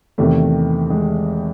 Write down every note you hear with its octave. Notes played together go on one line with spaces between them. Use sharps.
E2 C3 D#3 A3
G#3